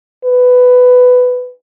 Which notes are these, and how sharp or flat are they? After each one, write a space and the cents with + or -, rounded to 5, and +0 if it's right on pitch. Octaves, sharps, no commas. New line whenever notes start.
B4 +10